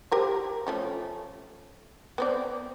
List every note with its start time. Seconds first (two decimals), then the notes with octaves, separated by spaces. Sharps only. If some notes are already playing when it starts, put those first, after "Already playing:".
0.11 G4 A#4 C5
0.67 F3 A3 C#4
2.18 B3 C4 D5